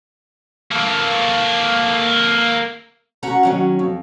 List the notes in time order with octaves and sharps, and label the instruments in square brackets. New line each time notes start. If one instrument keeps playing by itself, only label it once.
[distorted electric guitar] A#3 A4
[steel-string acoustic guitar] C#4 F#4 F#5 A#5
D#3 F#3 C#4
F2